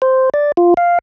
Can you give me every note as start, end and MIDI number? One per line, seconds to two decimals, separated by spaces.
0.02 0.30 72
0.34 0.52 74
0.57 0.74 65
0.77 0.99 77